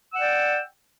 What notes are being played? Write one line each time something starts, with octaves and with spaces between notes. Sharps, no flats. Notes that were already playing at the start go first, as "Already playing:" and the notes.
D5 F#5 G5 E6